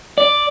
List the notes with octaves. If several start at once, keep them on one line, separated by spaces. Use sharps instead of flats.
D5